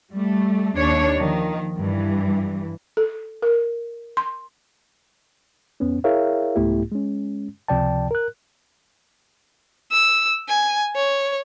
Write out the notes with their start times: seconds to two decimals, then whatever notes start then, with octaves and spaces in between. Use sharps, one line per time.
0.12 G3 A3
0.76 D#2 D4 C#5
1.19 D#3 F3
1.78 G2 E3
2.97 A4
3.42 A#4
4.17 C6
5.80 F2 B3 C#4
6.04 E4 G#4 A#4 C#5 E5 F5
6.55 C2 G#2 A3 B3 E4 G4
6.92 G#3 C#4
7.68 C#2 C3 F3 D5 G5 A5
8.11 A#4 F#6
9.92 E6
10.48 G#5
10.95 C#5